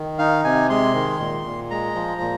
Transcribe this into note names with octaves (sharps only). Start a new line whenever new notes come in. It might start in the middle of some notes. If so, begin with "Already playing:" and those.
Already playing: D#3
D#4 F5
C3 G#5
G#3 C6
D#3
A#2
A#2
G#3 A#5
F3
A#2